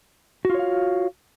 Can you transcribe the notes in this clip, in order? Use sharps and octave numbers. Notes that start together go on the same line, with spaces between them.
F4 F#4 C#5 F5